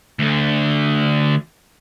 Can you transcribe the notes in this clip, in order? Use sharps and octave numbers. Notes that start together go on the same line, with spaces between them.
D2 D3